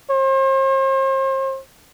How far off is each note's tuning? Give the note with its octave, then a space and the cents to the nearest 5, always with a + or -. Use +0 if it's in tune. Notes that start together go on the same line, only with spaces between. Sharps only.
C5 +40